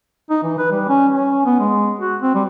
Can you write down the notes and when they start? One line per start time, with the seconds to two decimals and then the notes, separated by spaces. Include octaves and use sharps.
0.30 D#4
0.43 E3
0.58 B4
0.71 G3
0.88 C#4
1.13 C#4
1.45 B3
1.60 G#3
1.99 F#4
2.22 C4
2.35 G3